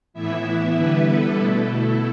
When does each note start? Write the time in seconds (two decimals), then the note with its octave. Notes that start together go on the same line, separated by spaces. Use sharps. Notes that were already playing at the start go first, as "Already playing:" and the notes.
0.14 A2 E3 B3 E4 E5
0.75 D3 G3 B3 E4 B4
1.05 A4
1.35 B2 A3 E4 A4